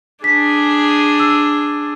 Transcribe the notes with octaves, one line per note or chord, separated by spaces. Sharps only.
D4 G#4 B6
E6